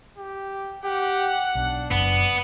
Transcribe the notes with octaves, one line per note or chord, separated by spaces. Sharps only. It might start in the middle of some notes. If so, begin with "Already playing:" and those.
G4
G4 F#5
B1 D4
F#1 B3